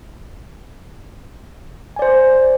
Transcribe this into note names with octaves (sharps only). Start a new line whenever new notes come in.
C5 D5 G#5